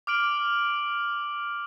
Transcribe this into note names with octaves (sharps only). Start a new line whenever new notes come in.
D6 F6 D7 F#7